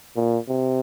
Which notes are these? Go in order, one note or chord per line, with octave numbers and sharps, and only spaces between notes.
A#2
C3